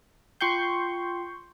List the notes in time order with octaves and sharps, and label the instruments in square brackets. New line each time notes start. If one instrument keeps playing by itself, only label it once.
[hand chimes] F4 G5 C7 [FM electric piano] C6 C#6 G6